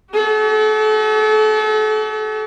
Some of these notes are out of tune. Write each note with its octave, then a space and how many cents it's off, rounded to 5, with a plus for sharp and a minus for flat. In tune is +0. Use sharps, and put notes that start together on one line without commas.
F#4 +45 A4 -35